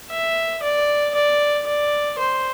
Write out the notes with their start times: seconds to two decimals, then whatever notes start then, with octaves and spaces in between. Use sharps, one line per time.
0.11 E5
0.63 D5
1.15 D5
1.67 D5
2.19 C5